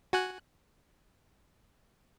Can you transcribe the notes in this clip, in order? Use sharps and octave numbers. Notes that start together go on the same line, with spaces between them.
F#4 G#5 F#6